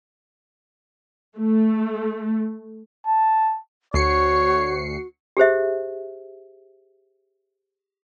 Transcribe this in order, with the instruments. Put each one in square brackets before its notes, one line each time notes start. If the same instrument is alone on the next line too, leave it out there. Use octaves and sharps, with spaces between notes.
[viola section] A3
[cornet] A5
[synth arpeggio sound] D2 C7 C#7 [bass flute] F#4 [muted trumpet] C#5
[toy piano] G4 G#4 C5 E5